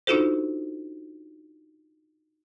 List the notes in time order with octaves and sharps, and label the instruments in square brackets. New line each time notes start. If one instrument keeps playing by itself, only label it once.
[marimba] D4 D#4 F4 F#4 A4 C5